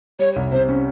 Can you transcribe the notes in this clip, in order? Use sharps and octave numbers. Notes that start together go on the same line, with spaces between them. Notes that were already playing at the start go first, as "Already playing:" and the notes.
G3 C#5
C2
C3 C5
C#4